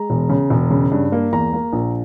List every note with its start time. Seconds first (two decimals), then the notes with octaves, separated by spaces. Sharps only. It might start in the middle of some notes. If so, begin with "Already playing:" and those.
Already playing: G#3 A#5
0.10 E1
0.29 C#3
0.50 E1
0.71 C#3
0.92 G2
1.12 A#3
1.32 E2 A#5
1.53 A#3
1.73 A#1